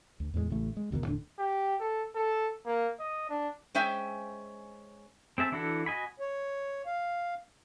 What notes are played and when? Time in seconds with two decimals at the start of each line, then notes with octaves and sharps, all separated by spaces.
0.20 D2
0.34 E2 A2 G3 G#3
0.50 A1 C#3 A3
0.77 G#3
0.91 G1 D2 B2 D#3
1.06 D#1 A2 D3 D4
1.39 G4
1.80 A4
2.15 A4
2.66 A#3
3.00 D#5
3.29 D4
3.75 G#3 C#4 C5 E5 G5
5.38 C4 G#4 E5 A5
5.52 E3 D4 E4 F#4 A4
5.86 F#4 D#5 G#5 B5
6.20 C#5
6.86 F5